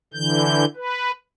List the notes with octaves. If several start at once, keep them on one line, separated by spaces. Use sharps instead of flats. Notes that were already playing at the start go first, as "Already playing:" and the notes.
D3 E3 G6
B4